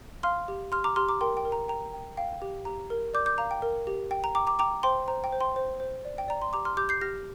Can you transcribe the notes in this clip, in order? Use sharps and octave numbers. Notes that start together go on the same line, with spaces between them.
F5 C6 F6
G4
G4 C6 F6
A#5 D6
G4 C6 F6
A#5 D6
A#4 G5 C6
G5
A#4
A#5
G5 A#5
G5
F5 G5
G4
G4 A#5
A#4
D5 D6 G6
D6 G6
F5 A#5
G5
A#4
G4
G5
A#5
G5 A#5 D6
A#5 D6
G5 A#5 D6
C5 G5 C6
C5 A#5
G5
C5
G5 C6
C5
C5
D5
G5
D5 A#5
C6
G4 A#5 D6
C6 F6
G4 D6 G6
G6 C7
G4 F6 A#6